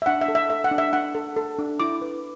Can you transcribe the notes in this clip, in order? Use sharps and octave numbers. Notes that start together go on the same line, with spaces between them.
E5
D4 F#5
E5
A4
E5
A4 E5
F#5
D4
E5
D4 F#5
A4
A4
D4
E4 D6
B4